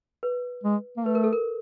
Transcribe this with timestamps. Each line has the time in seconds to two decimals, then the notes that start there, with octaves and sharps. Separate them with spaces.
0.23 B4
0.64 G#3
0.97 A#3
1.05 A3 B4
1.15 A#4
1.24 A4
1.33 A#4